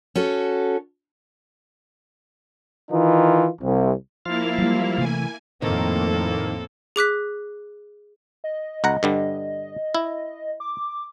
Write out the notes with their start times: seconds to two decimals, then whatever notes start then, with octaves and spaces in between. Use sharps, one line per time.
0.15 C#4 F#4 A4
2.91 D#3 E3 D#4 F4
3.62 C2
4.26 F3 A#3 E4 F4 F5
4.58 F#3 G3
4.98 C3 E3 A3 G#5
5.62 F2 A2 D#3 A#3 C4 A4
6.96 G#4 D6 F#6 B6
8.44 D#5
8.84 C#2 F#5 A#5
9.03 G2 D3 G3
9.95 E4
10.60 D6